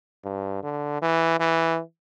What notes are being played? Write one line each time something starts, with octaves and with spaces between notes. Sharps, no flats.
G2
D3
E3
E3